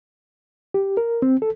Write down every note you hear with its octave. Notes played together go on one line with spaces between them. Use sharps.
G4
A#4
C4
A4